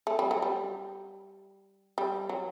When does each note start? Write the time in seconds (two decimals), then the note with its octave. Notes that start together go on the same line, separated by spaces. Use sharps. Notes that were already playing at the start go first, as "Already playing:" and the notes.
0.07 A3
0.19 G3
0.31 F#3
0.42 G3
1.98 G3
2.29 F#3